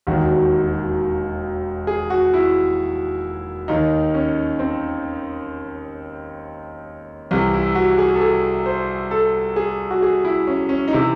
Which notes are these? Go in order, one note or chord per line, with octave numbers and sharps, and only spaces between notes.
E1 D#2 D#3 F#4
G#4
F#4
E4
D#2 D#3 D#4
C#4
C4
C2 C3 E3
E4
F#4
G#4
A4
G#4
C5
A4
G#4
F#4
G#4
E4
C#4
C#4
D#4
C3 E3 E4